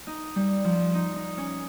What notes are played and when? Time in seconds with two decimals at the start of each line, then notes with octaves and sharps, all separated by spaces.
0.07 D#4
0.36 G3
0.65 F3
0.94 D#4
1.16 D#4
1.37 C#4